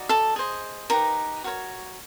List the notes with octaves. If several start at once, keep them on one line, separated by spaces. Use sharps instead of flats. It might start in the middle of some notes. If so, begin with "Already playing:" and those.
Already playing: D#4 F#4 D5
A4 A5
G#4 C5 D#5
D#4 G4 A#4 B4 A#5
F#4 A#4 C#5